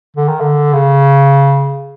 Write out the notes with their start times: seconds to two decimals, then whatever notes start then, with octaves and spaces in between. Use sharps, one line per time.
0.16 D3
0.28 D#3
0.40 D3
0.73 C#3